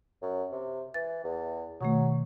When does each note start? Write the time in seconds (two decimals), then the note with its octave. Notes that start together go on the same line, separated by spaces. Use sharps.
0.22 F#2
0.52 C3
0.94 E3 A6
1.24 E2
1.81 B2 D#3 F#3 A3